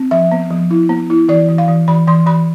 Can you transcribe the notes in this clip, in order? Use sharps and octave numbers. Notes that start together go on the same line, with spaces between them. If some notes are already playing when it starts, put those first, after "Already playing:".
Already playing: C4
F3 E5
B3
F3
E4
B3
E4
E3 D5
E3
F5
E3
E3 B5
E3 C6
E3 B5